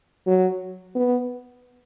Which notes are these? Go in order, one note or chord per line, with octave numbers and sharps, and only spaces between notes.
F#3
B3